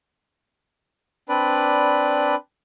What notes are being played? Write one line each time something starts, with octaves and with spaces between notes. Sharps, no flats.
C4 D4 B4 D5 B5